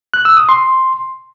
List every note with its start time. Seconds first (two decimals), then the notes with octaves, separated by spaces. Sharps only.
0.14 F#6
0.25 E6
0.37 D#6
0.49 C6